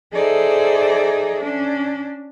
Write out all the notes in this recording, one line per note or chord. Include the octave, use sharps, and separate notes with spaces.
D#4 G#4 A4 C5 D5 E5
C#4 D4